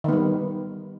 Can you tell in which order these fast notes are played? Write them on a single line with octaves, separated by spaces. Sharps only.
D#3 B3 G3